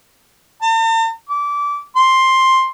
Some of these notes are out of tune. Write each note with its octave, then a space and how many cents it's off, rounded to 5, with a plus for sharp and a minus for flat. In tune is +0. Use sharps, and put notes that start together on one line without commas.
A5 +45
D6 -20
C6 +10